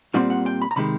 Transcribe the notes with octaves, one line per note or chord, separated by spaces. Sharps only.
A#2 G3 C4 F4 F#5
F#5
G5
B5
A#5
C3 D#3 G#3 B5